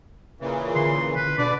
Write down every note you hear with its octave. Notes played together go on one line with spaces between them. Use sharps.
A#2 C#3 E3
D3 C6
D#1 B4
B2 D3 D4 B4 D5